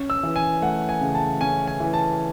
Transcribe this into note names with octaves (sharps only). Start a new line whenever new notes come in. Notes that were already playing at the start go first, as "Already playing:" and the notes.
Already playing: C#4
E6
E3
G#5
A3 F#5
G#5
C#3
A5
C#4 G#5
G#5
E3
A5